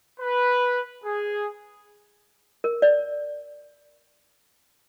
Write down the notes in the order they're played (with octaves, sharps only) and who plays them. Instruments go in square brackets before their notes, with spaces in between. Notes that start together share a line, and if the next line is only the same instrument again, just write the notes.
[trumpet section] B4
G#4
[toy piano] A#4
D5